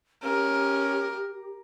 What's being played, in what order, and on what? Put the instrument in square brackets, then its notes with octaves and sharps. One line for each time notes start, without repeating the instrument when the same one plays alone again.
[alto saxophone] C#4 [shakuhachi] G4 [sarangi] A#4